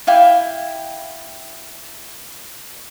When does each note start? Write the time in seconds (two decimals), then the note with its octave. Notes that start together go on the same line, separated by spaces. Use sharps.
0.07 E4 F5 G5 D6